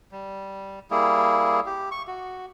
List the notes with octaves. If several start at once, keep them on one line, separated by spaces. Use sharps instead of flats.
G3
G3 A#3 E4 G#4
G4
C#6
F#4